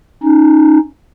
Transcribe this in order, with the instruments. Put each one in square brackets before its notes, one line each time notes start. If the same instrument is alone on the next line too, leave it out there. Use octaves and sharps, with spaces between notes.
[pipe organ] C#4 D#4